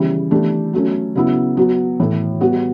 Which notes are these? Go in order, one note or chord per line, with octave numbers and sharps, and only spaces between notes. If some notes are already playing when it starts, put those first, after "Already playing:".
Already playing: C#3 E3 G3
E3 A3 D4 G4
F#3 A3 C#4
C#3 F#3 B3 E4
F#3 B3 F#4
A2 E3 A3
G3 B3 F#4